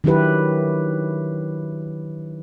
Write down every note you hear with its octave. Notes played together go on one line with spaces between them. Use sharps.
D#3 F#3 D4 E4 G4 B4